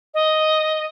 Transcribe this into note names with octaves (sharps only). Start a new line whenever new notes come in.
D#5